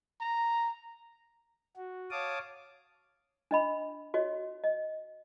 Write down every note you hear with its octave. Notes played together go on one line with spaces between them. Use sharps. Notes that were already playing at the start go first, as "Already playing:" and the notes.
A#5
F#4
C#5 F5 A5 D6 D#6
D4 D#5 B5
F#4 C#5 D#5
D#5